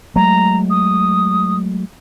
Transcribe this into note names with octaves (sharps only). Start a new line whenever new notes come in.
F#3 G#3 A3 A#5
D#6